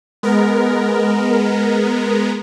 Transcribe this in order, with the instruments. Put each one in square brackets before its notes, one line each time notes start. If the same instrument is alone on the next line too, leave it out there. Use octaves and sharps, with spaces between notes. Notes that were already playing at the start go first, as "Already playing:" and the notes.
[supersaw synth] G#3 B3 A#4